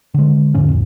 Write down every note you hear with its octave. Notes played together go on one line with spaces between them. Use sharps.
D3 G#3
D#2 G#2 D3 C#4
A1 F2